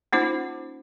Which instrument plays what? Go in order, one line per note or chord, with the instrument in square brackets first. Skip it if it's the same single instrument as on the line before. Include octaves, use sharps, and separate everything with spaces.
[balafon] A#3 C#4 D#4 F4 C5